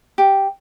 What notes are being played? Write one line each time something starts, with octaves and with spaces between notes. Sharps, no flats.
G4